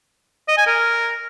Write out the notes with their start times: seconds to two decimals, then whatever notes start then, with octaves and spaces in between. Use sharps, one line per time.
0.48 D#5
0.57 G#5
0.67 A#4